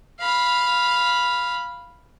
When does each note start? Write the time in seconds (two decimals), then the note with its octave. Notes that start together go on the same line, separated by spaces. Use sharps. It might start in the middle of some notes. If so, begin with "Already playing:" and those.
0.20 F5 B5